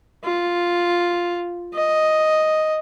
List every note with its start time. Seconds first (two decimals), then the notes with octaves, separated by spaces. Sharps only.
0.24 F4
1.74 D#5